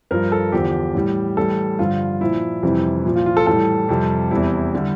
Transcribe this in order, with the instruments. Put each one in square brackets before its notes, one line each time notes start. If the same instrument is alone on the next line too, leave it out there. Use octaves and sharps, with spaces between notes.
[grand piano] G2 F3 A#4
A4
E2 D3 F3 G4
A2 E3 G3
A2 E3 G3 A4
G2 D3 F3 F4
A#2 F3 E4
F2 C3 E3 G3
A#2 F3
F4
F4
A4
A2 E3 G3 A4
F2 C3 G3
E2 C3 G3 E4
D3 G3